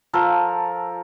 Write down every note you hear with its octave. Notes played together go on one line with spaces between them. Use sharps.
F3 A4 A#4